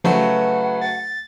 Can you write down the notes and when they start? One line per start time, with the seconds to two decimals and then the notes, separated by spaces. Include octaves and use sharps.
0.04 C#3 F3 F#3 A3 B4 F#5
0.81 A6